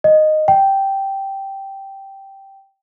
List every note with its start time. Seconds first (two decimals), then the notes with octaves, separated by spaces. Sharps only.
0.04 D#5
0.48 G5